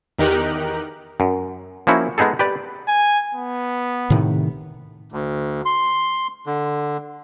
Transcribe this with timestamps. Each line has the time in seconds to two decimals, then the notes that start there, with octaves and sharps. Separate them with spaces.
0.19 E2 D#3 D#4 G4 A#4 F#6
1.20 F#2
1.87 F3 A#3 C#4 E4 F#4
2.18 G#3 B3 D#4 G#4 A4
2.39 G4 B4 D5
2.88 G#5
3.35 B3
4.10 A2 C3 D#3
5.12 D2
5.65 C6
6.46 D3